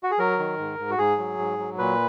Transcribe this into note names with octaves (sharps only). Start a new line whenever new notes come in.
F#4
G#4
F#3 A#4
D#3
G#2
G#2
F#4
G#2 G#4
F#3
G#2
F#3
A#2 B4